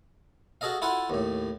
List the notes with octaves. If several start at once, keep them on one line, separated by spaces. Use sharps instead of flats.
F#4 G#4 A4 D#5 F5
E4 F4 A4 F#5 G#5
D#2 A2